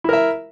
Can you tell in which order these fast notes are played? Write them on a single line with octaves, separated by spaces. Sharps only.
E4 A#4 E5